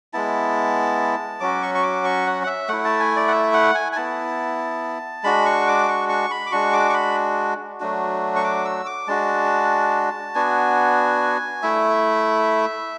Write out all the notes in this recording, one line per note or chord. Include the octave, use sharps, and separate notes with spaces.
G#3 B3 E4 A5
F#3 C#4 F#4 D6
C#6
C#6
D6
C#6
F#5
F#5
E5
A3 E4 F#5
A5
G#5
D5
F#5
E5
F#5
G#5
G#5
B3 E4 A5
G#3 D4 F#4 B5
C#6
D6
C#6
C#6
B5
D6
G#3 D4 F#4 C#6
D6
C#6
B5
F#3 A3 D4 F#4
C#6
D6
E6
D6
G#3 D4 F#4 A5
B3 D4 F#4 G#5
A3 E4 E5